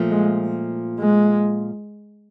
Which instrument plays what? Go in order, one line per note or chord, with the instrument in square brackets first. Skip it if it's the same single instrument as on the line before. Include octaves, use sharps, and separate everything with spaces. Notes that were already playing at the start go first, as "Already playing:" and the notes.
Already playing: [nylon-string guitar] A#2 F3 A3
[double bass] G#3
G#3